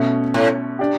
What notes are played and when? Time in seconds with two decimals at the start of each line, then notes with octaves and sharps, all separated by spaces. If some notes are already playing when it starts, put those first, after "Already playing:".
Already playing: B2 A3 C#4
0.34 A2
0.79 D4 G4